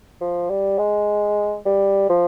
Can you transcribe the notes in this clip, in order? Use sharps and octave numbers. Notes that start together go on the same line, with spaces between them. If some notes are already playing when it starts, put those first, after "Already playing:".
F3
G3
G#3
G3
F3